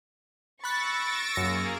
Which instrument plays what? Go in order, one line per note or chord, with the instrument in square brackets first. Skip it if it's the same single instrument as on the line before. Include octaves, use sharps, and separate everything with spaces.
[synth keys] B5 F#6 [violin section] C#6 A6 [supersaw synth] E6 A#6 D7
[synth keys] F#2 A#6 C#7 [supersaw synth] A#3 G#4 A#4